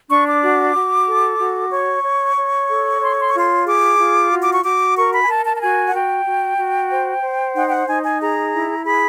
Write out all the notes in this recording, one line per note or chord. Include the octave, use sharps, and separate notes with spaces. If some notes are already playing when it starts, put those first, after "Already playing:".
D4 C#6
D6
F#4
F#4
A4
F#4
C#5 C#6
C#5
C#5
A4
C#5 C6
C#6
C6
C#6
F4 C6
G#4 D6
F4
F#4
D6
C#6
F#4 D6
A#4 C#6
B5
G#5
A#4 A5
A5
A5
F#4 G#5
F#5
F#4 G5
F#4
F#4
C5
C5
D#4 F#5
G5
F#5
D#4 G#5
G#5
G#4 A#5
E4
G#4 B5